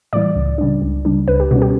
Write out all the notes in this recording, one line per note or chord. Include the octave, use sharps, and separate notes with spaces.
A2 E3 G3 D5
C#2
C#3 G3 D4
C#2
C#3 G3 D4
C#2 B4
G4
B2 G3 C#4 F#4
G4